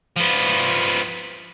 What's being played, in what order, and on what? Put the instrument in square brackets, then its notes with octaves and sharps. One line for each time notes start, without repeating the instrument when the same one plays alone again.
[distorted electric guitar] F3 B3